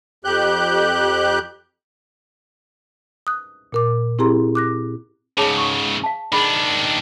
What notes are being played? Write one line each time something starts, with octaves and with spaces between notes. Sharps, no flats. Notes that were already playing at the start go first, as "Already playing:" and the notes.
F2 G4 F#6 G6
D#6 F#6
A#2 A#4 D6
C4 E4 G4 G#4 A#5 C6
D6 F#6 A#6
G#2 C#3 G#4 C#5 A5
C#6
F5 A5
D#3 D4 G#4 B5